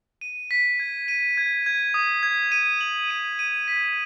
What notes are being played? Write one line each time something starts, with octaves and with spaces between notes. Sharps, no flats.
D#7
B6
G#6
D#7
G#6
G#6
D#6
G#6
D#7
F#7
D#7
D#7
B6